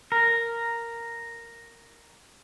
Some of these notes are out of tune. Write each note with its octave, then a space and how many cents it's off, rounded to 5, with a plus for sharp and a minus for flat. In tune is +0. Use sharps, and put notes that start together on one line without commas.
A#4 -5